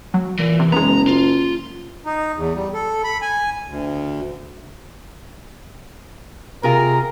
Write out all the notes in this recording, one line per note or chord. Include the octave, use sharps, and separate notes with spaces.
F#3
A#2 E3
C3
F#1 G#3 B3 A#5
F4
D#4
E2
G3
A4
B5
G#5
D2
C3 F4 G#4 A#4